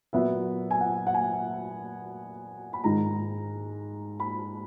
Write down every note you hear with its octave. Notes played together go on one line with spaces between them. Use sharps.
A#2 F#3 B3 E5
G#5
F#5
F#5
G#5
B5
G#2 D#3 G#3 A#5
B5